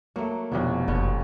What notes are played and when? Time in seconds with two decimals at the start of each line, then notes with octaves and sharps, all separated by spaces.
0.16 F#3 A3 A#3
0.52 F1 F2 B2 E3 C#4 D4
0.88 F#1 D3 B3 C#4